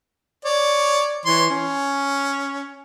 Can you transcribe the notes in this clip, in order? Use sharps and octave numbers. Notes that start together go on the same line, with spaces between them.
C#5 D5
E3 C#5 C6
C#4